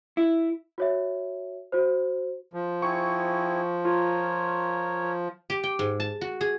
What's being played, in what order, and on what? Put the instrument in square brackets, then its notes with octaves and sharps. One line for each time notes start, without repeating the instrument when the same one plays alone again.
[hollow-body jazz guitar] E4
[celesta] F#4 C#5 E5
F#4 C5
[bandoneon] F3
[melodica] C4 E4 G#4 [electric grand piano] C#6
[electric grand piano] F4 [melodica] A#4 C#5
[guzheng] G4
G5
G#2
A5
F#4
G#4